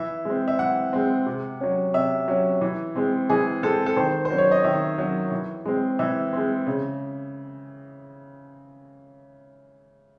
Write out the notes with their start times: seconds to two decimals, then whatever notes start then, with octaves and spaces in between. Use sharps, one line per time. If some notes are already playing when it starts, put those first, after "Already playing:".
Already playing: E3 E5
0.25 G#3 C4
0.48 E5
0.59 E3 F#5
0.93 G#3 C4
1.26 C3
1.61 F#3 C#4
1.94 C3 E5
2.28 F#3 C#4
2.61 E3
2.96 G#3 C4
3.30 E3 G#4
3.63 G#3 C4 A4
3.86 A4
3.97 D#3 C5
4.25 C5
4.30 F#3 C#4
4.38 C#5
4.51 D#5
4.64 D#3 E5
4.98 F#3 C#4
5.32 E3
5.65 G#3 C4
5.99 E3 E5
6.33 G#3 C4
6.67 C#3